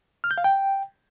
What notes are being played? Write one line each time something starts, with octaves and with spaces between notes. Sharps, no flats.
F6
G6
F5
G5